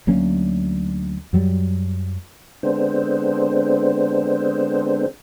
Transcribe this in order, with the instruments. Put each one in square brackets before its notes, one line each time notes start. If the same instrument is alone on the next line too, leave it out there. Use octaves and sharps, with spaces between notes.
[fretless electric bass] D2 F#3 A#3 C#4
F#2 F#3 G3
[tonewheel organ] D3 G#3 B3 C4 D4 C5